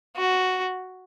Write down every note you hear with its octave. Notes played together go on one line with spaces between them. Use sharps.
F#4